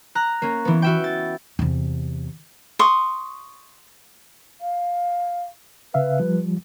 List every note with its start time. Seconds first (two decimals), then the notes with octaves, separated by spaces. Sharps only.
0.15 A#5 F#6
0.42 A#3 C#4
0.65 E3 B3
0.82 F#4 E5 G5
1.04 A6
1.59 E2 C3
2.79 C6 C#6 D#6
4.61 F5
5.94 C#3 B4 E5 F5
6.20 F3 G3